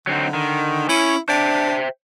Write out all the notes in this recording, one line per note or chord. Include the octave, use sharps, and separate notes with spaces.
D3 F#3 C4 D#4
D#3
C#4 E4
D4 C5 E5 G5